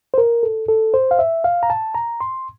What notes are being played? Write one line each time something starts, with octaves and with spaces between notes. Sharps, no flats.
C5
A#4
A4
A4
C5
F5
E5
F5
A#5
A5
A#5
C6